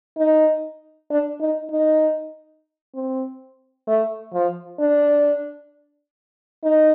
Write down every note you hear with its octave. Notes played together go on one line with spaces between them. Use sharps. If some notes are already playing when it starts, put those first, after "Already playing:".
D#4
D4
D#4
D#4
C4
A3
F3
D4
D#4